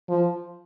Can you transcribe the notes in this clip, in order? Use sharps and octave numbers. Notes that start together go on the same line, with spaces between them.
F3